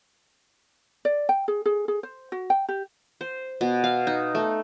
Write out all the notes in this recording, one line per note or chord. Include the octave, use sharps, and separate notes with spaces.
D5
G5
G#4
G#4
G#4
C5
F#4
G5
G4
C5
B2
F5
D#4
A3